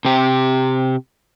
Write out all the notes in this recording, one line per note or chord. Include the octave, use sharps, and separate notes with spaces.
C3 G4